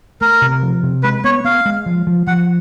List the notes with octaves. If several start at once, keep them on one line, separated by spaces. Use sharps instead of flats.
A3 A#4
C3
F3
C3
G#3 B4
B3 C#5
B3 F5
G#3
F3
F3
F3 F#5